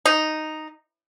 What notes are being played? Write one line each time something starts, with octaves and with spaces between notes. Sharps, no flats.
D#4